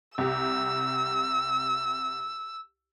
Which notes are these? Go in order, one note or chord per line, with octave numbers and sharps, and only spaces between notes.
C2 G4 E6